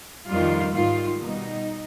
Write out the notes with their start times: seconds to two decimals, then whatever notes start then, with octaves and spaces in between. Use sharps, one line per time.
0.28 F2 D#3 G3 F4
0.74 G#2 D#3 G3 F4
1.19 B2 G3 D#4